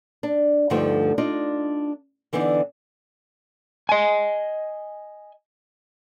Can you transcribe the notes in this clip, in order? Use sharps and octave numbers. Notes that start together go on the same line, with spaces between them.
D4
D2 G2 D3 F3 A3 D#4
D4 D#4 F4 D#5
D3 E3 B3 D4 D#4
D#5 G#5